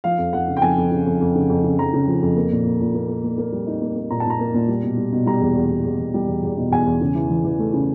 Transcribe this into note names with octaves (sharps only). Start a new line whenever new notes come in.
F3 F5
F2
F2 F#5
C#3
G5
F2 G#5
F2
C#3
F2
F2
C#3
F2
C#3
F2 A#5
C#3
F3
F2
A#3
A#2
A#3
A#2
A#3
A#3
A#3
A#3
G3
D#4
A#3
A#3
A#2 A#5
A5
A#2 A#5
A#3
A#2
G3
B2
G3
B2
G3 A#5
E2
E2
G3
E2
E2
G3
E2
E2
B2
E2 G#5
E2
C#3
E3
E3
E3
A3
C#3